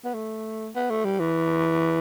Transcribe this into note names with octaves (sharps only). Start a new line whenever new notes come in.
B3
A3
B3
A3
G3
E3